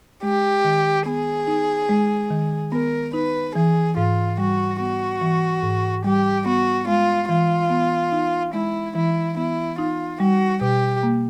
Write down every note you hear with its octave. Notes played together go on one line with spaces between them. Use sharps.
G#3 G4
D#3
B3 G#4
D#4
G#3
D#3
B3 A#4
D#4 B4
E3 G#4
G#2 F4
G3 F#4
B3 F#4
E3
G#2
G3 G4
B3 F#4
G#3 F4
E3 F4
B3
D#4
G#3 E4
E3 E4
B3 E4
D#4 F4
G3 F#4
B2 G4
A#3